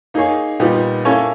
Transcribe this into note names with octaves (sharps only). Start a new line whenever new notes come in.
A#3 D#4 G#4 C#5
A#2 G3 B3 D#4 G4
A#3 C#4 E4 A4 C#5